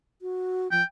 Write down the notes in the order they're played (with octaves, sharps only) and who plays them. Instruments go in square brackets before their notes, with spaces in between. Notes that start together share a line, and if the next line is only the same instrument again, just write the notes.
[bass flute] F#4
[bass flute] F3 [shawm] G5